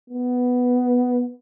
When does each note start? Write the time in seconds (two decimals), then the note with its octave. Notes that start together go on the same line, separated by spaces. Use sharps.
0.10 B3